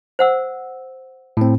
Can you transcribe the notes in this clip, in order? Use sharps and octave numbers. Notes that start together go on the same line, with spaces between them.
C5 F#5 E6
A2 C4